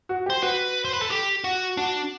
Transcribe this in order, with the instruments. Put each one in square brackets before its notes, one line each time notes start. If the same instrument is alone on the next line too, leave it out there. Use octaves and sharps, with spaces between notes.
[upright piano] F#4
G4
[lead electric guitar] C5
[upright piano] F#4 [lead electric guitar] B4
[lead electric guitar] C5
B4
A4
G4
F#4
[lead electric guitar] D4 [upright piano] F#4